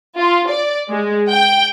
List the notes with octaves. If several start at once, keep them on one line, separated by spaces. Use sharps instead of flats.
F4
D5
G#3
G5